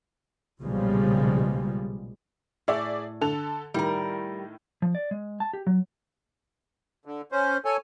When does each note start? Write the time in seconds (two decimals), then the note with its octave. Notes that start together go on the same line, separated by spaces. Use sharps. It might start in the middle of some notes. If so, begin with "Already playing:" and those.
0.60 B1 A#2 C#3 F3 G3 G#3
2.68 A2 G#4 D5 E5
3.21 D3 A4 F7
3.74 A2 D#3 G3 A#4
4.82 F3
4.95 D5
5.11 G#3
5.40 A5
5.53 G4
5.67 F#3
7.05 D3
7.32 C#4 C5
7.65 A4 C#5 G#5